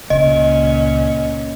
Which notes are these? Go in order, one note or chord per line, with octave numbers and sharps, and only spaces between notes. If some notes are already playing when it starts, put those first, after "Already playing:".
C#2 A#2 C#4 D#5